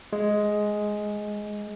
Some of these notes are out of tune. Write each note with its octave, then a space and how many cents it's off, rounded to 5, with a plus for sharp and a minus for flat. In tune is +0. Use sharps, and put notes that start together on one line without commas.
G#3 +5